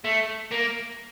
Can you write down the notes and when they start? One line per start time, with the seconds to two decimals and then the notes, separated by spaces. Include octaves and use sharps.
0.05 A3
0.52 A#3